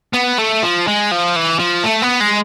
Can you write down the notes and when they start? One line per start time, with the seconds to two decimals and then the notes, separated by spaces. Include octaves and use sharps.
0.14 B3
0.39 A3
0.63 F3
0.87 G#3
1.11 F3
1.36 E3
1.59 F3
1.84 A3
2.02 B3
2.20 G#3